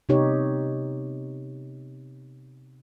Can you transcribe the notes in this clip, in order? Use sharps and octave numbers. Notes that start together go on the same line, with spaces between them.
C3 B3 D#4 G4 C#5